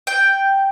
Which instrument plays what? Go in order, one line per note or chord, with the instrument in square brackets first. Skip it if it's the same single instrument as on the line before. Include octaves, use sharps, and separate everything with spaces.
[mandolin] G5